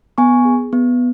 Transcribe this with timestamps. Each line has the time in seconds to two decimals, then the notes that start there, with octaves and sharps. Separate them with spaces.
0.18 B3 G#5 C#6
0.45 G#4
0.73 B3